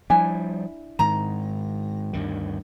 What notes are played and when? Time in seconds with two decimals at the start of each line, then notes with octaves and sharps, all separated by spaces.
0.10 F3 G3 D4 E4 G#5
0.99 G#2 D#3 A#5
2.13 D2 G2 D#3